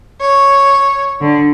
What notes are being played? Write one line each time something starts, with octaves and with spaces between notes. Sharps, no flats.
C#5
D3